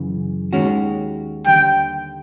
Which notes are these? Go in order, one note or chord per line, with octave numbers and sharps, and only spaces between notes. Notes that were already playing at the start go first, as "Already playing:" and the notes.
Already playing: F#2 C#3 E3
D#2 D#3 G#3 C#4 F#4
D#2 D3 G3 G5